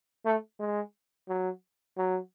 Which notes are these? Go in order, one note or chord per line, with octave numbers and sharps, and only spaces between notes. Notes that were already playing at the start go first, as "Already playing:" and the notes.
A3
G#3
F#3
F#3